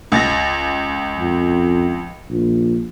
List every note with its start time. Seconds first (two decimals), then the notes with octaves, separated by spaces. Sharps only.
0.12 C#2 A6 A#6
1.18 F2
2.30 A#1